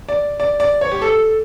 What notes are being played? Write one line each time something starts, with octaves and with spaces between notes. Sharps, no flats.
D5
D5
D5
C#5
G4
A4